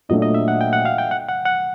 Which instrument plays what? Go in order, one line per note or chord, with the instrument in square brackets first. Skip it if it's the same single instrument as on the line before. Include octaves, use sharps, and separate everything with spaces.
[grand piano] A#2 F#3 A3 D4 [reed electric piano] D#5
[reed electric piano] D#5
E5
F#5
G5
F#5
F5
G5
F#5
F#5
F#5